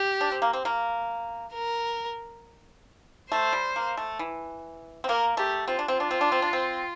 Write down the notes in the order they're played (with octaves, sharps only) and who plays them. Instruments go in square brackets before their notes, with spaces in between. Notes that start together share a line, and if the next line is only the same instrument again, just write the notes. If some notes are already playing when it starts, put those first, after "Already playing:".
Already playing: [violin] G4
[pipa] D4
C4
A#3
C4
A#3
[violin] A#4
[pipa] A3 [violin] C5
[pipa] G3
A#3
A3
E3
C4
[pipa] A#3 [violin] A#4
[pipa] A3 [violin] G4
[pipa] C4 [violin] F4
[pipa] D4
C4
[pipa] D4 [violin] F4
[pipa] C4
D4
C4
D4
C4